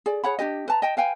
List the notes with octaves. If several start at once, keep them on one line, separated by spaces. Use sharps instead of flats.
G#4 D5
G#4 C#5 F#5 B5
D4 F#4 G4 D#5
B4 A5 A#5
D#5 G5 A5
B4 F5 G5 G#5